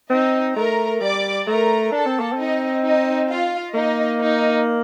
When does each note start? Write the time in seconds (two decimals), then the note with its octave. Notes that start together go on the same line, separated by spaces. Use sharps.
0.10 C4 D#4 D#5
0.56 A3 A#4 A#5
1.01 G3 D5 D6
1.47 A3 A#4 A#5
1.92 D4 A4 A5
2.06 C4
2.20 A#3
2.33 C4 D#4 D#5
2.84 D#4 D#5
3.29 F4 F5
3.74 A#3 D#4 D#5
4.20 D#4 D#5